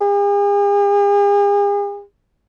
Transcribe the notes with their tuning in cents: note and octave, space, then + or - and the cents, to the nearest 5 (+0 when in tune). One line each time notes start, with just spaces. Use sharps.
G#4 -45